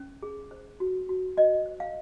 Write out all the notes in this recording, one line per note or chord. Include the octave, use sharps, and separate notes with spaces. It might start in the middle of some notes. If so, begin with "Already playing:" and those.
Already playing: C#4
G#4
C5
F#4
F#4
F#4 D#5
C5
F5